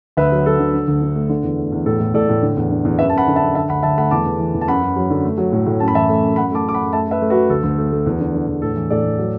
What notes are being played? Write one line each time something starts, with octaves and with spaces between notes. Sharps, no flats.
D2 B4 E5
F#3
F#3 A4
D3
D3
D2
D3
A3
D3
E2
A3
E2
A2 A4
A2
A2 A4 D5
A2
D3
E2
D3
E2
F#2 B4 E5
A5
F#2 F#5 B5
D3
E5 A5
F#2
D3 E5 A5
D2 F#5 B5
D2 E5 A5
A3 F#5 B5
E2 A5 D6
E2
E3
E2
A5
F#2 F#5 B5
F#2
F#3
D3
A3
F#3
A2
A2
F#2 A5
B5
E3 E5 A5
A3
F#2
F#2 F#5 B5
A3 A5 D6
F#2 D6
F#5 B5
F#2
A3 E5 A5
A3 B4 E5
A3
F#4 B4
A3
D2 A4
D2
A3
A3
E2
D3
D3
E2
A2 A4
E3
A2 A4 D5
A2
F#3